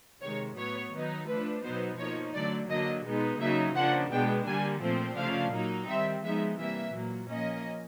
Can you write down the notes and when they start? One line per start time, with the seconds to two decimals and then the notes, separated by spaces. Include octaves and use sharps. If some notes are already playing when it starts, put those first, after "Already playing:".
0.21 C3 D#3 G#3 C#5
0.57 A2 F#3 B3 C#5
0.92 D#3 F#3 B3 D#4
1.28 F3 A3 D4 B4
1.63 B2 F#3 B3 D#4 C5
1.99 F3 A#3 D#4 C#5
2.35 D3 F#3 A3 D5
2.70 D3 F#3 A#3 D4 D#5
3.05 B2 G#3 B3 D#4
3.41 C#3 F#3 A#3 D#4 E5
3.76 C#3 F3 A#3 D4 F#5
4.11 B2 G#3 B3 D4 G5
4.47 D3 G3 A#3 G#5
4.82 A#2 F3 A3 C4
5.17 C#3 F3 A3 D4 F5
5.53 A#2 F#3 A#3 D#4
5.89 D#3 G3 C4 E5
6.24 F3 G#3 B3 D#4 E5
6.59 C3 E3 G3 A#3 E5
6.94 A#2 F#3 A#3
7.31 F3 A#3 C#4 D#5